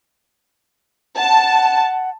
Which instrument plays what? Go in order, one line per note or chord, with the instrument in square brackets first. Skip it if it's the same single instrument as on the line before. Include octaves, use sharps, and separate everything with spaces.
[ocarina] F#5 [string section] A5